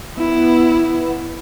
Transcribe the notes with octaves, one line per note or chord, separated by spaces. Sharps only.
B3 E4